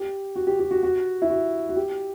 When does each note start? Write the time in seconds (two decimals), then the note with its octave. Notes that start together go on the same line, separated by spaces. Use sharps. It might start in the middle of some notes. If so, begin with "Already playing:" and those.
Already playing: G4
0.36 F#4
0.47 G4
0.59 G4
0.71 F#4
0.83 F#4
1.22 E4
1.30 F#4
1.69 F#4
1.76 G4